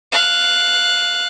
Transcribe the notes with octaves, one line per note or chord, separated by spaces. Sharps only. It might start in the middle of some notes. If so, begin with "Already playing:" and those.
F5 F#6